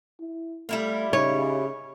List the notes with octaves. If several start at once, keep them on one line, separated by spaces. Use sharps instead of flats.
E4
G3 A3 E4 F4
C#3 D#4 C#5